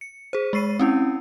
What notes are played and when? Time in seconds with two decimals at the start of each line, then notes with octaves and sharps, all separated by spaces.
0.01 C#7
0.33 G#4 C5
0.53 G#3 C#6 C7 D#7
0.79 C4 C#4 E4